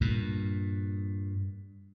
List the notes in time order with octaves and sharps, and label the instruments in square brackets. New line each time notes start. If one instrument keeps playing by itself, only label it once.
[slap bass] G2 A#2